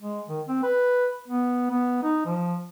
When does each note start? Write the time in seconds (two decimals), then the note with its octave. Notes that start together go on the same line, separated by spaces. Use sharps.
0.01 G#3
0.28 D#3
0.48 C4
0.63 B4
1.28 B3
1.71 B3
2.03 D#4
2.26 F3